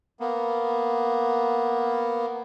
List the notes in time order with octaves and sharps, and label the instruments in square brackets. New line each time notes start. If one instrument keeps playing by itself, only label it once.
[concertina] A#3 B3